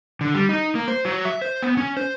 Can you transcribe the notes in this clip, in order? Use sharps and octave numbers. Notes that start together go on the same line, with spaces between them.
D3
G3
D#4
A#3
C5
F#3
E5
C5
B3
C#4
C5